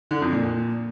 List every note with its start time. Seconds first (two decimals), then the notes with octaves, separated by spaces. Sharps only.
0.11 D3
0.22 F2
0.33 A#2